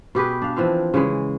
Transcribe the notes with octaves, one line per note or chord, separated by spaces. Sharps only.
B2 G4 G#4 B4
D4 F5
E3 F3 C4 F5
C#3 E3 G#3